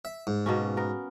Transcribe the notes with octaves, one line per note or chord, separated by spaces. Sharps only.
E5
G#2
B2 A#3 C#4
B3 A#4